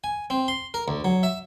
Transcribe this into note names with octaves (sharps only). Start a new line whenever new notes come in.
G#5
C4
C6
A#4
D2
F#3
E5